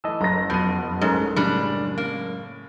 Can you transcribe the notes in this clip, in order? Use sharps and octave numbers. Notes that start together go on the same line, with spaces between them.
E3 A3 D#5 A5 E6
F#1 A#5 A#6
F2 B2 A5 G6 D#7
C2 G#2 G#3 A3 C#4 A#4 C#7
A2 C#3 G3 D4
A#3